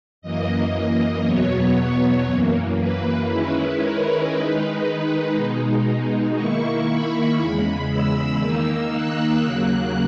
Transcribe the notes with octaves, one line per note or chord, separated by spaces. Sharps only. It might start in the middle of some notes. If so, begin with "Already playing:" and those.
F#2 E3 A#3 D#5
E2 B2 F#3 B3 C#5
F#2 E3 A#3
B4
D#3 G#3 C#4 E4
A#4
D#3 G#3 D#4 B4
B2 G#3 D#4
D#3 A#3 E4 C#6
B5
E2 C#3 G#3
E6
D#3 A#3 D#4
F#6
D#2 C#3 F#3 A#3